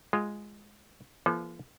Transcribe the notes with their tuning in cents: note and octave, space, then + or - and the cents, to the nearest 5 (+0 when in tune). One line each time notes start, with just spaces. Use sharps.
G#3 +0 F4 +0
F3 -35 A#3 +45 A4 -40